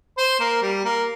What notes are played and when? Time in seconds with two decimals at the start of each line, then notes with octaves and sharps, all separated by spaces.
0.18 C5
0.40 A#3
0.62 G3
0.85 A#3